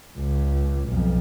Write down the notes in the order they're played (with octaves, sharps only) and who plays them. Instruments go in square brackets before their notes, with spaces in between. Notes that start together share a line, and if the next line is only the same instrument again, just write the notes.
[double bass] C#2
B1 F2